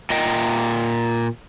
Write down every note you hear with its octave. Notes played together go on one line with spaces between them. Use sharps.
A#2 D#5 G5